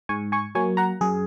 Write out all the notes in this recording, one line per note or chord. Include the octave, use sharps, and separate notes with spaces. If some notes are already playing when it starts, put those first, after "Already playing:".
G#2 G#5 C#6
G#5 C#6
F#3 A#3 G#5 C#6
F#5 A#5
F#2 G#4